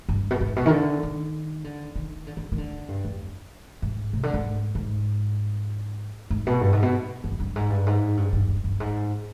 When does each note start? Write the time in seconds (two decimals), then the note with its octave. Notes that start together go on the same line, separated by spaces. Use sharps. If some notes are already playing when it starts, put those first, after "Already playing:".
0.09 G2
0.31 B2
0.41 G#2
0.56 B2
0.66 D#3
0.71 D3
1.03 D#3
1.64 D3
1.95 D#3
2.27 D3
2.37 D3
2.52 D#3
2.58 D3
2.89 G2
3.04 F2
3.82 G#2
4.13 C3
4.23 D3
4.34 G#2
4.75 G#2
6.30 G#2
6.47 B2
6.61 G2
6.73 G#2
6.82 B2
7.24 G2
7.32 F2
7.40 G2
7.56 G#2
7.70 G2
7.86 G#2
8.17 G2
8.33 G2
8.48 G2
8.64 G2
8.80 G#2